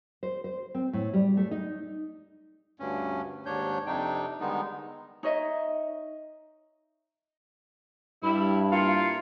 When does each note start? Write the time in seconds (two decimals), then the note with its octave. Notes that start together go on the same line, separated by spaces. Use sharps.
0.23 C5
0.44 C5
0.75 C4
0.93 A2
1.14 G3
1.37 A3
1.51 D#4
2.80 D2 G2 C#4
3.46 D#2 G#2 D4 C#5 G6
3.86 F2 C3 D4 D#4 G5
4.41 D3 D#3 G3 G#3 B3 D#4
5.23 D#4 C#5 D#5 E5
8.23 G2 G3 E4 B5
8.72 A#3 E4 F4 F5 C#7